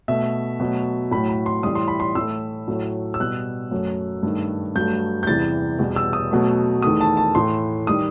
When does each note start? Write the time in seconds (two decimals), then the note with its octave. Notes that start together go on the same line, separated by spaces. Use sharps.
0.08 B2 A3 E5
0.60 B2 F#3 A3
1.11 A2 F#3 A3 B5
1.29 B5
1.46 C6
1.63 A2 E3 G3 D#6
1.75 C6
1.88 B5
2.00 C6
2.15 A2 E3 A3 E6
2.68 A2 F#3 A3
3.14 E6
3.20 B2 G3 F#6
3.71 F#2 F#3 A3
4.23 G2 D#3 A3
4.75 G2 F#3 A3 G6
5.23 G6
5.27 E2 C3 E3 G3 A6
5.79 E2 B2 G3
5.96 E6
6.13 D#6
6.31 B2 F#3 A3
6.82 E2 D#3 A3 D#6
7.01 A5
7.17 A5
7.35 A2 E3 A3 C6
7.87 D#3 G3 D#6